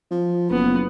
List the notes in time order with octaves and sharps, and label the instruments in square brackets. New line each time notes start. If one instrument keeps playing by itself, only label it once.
[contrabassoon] F3
[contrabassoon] F#1 [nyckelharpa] B3